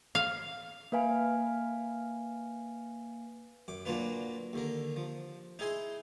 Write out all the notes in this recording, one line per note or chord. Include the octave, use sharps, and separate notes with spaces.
F5
A#3 B4 F5 G#5
F#2 D6
A#2 F#3 A#3 D4 F4 B4
D#2 D3 A#4
F3
D#4 E4 G#4 G#5 C6